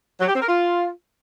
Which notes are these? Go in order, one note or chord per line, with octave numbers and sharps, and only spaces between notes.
F#3
G4
C4
A#4
F4